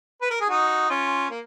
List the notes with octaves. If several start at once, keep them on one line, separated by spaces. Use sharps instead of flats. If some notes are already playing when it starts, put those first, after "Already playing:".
B4
A#4
G#4
D#4 F#4
C#4 F4
A#3